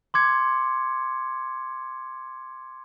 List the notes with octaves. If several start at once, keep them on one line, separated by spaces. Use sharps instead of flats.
C6 D6 G#6 C#7